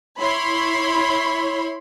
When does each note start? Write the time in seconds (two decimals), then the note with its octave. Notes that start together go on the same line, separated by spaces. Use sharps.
0.20 E4 C#5 B5 C6